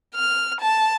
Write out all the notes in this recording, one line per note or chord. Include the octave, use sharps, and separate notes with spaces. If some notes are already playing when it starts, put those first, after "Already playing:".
F6
A5